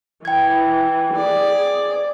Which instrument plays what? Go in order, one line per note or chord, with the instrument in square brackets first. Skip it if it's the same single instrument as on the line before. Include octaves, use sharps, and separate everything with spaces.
[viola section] E3 [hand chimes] G5 G#6
[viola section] G#4 [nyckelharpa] D5